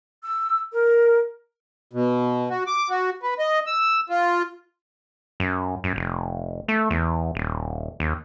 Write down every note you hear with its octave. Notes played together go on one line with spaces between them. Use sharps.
E6
A#4
B2
F#4
D6
F#4
B4
D#5
E6
F4
F#2
F#2
F1
A3
E2
D#1
D#2